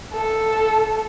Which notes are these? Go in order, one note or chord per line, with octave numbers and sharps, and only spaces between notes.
A4